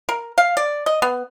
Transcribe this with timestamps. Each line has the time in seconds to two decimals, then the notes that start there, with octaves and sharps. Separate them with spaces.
0.09 A#4
0.38 F5
0.57 D5
0.86 D#5
1.02 B3